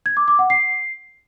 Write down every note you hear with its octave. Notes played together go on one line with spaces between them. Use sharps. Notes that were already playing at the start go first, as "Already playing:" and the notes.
G#6
D6
D6
F#5
C7